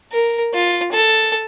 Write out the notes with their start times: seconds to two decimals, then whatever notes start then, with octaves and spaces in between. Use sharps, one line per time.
0.12 A#4
0.53 F4
0.92 A4